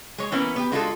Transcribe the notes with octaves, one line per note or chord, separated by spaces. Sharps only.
G#3 C#5
E3 A#3 B3 C#4
B3 G4
G#3 D4 F4 F#4 G#4 A4